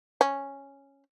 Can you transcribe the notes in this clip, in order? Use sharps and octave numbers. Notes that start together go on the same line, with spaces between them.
C#4